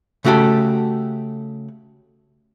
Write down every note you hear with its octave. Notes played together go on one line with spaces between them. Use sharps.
C#3 A3 F#4 G4 A4